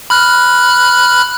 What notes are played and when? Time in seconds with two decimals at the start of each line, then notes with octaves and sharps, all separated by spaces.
0.10 B5 F6 F#6